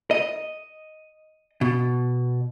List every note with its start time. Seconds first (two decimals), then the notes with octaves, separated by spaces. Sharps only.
0.11 D#5
1.61 B2